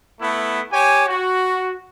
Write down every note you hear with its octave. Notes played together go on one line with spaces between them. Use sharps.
A3 B3 E4
G4 C#5 G#5
F#4